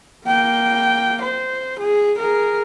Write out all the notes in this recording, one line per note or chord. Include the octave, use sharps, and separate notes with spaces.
A#3 G5
C5
G#4
G#4 A#4